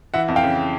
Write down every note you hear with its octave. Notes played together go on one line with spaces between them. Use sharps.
E3 E5 F#5
F2
F5 G5
C#3